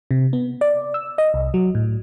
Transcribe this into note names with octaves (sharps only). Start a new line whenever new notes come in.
C3
B3
D5
E6
D#5
C2
F#3
A2